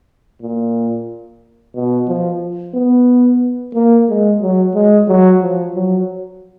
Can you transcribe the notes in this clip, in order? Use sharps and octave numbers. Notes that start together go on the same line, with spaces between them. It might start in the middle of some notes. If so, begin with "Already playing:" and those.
A#2
B2
F3
B3
A#3
G#3
F#3
G#3
F#3
F3
F#3